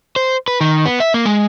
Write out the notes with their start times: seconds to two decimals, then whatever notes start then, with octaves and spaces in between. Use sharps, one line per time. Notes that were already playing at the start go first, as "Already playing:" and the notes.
0.16 C5
0.48 B4
0.61 D#3
0.86 B3
1.00 E5
1.14 A#3
1.26 G#3